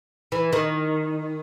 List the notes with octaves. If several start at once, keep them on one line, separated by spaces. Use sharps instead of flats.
E3
D#3